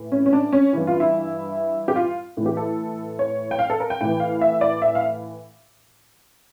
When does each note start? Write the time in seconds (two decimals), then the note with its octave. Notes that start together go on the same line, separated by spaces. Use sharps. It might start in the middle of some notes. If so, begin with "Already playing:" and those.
Already playing: A2 E3
0.12 C#4
0.26 C#4
0.33 D4
0.53 C#4
0.73 G2 E3
0.87 F4
1.00 E4
1.88 G4
1.96 F4
2.37 A2 E3
2.46 G4
2.57 A4
3.19 C#5
3.51 G5
3.59 F5
3.70 A4
3.80 A#4
3.90 G5
4.01 A2 E3 G5
4.20 F5
4.41 E5
4.61 D5
4.82 E5
4.95 F5